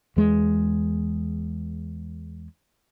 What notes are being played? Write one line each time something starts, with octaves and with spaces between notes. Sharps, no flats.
E2 G#3